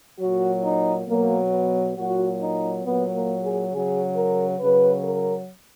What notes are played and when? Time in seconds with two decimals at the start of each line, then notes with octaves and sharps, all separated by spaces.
0.20 A#2 F#3 F#4
0.64 D#4
1.07 B2 F#3 A#3
1.51 B3
1.96 A#2 F#3 F#4
2.40 D#4
2.84 A#2 F#3 B3
3.13 A#3
3.42 G#4
3.71 C#3 F#3 G#4
4.16 A#4
4.59 C#3 F#3 B4
5.04 A#4